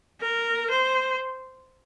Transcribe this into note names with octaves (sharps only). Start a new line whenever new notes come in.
A#4
C5